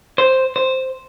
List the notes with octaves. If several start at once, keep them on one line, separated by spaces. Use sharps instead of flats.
C5
C5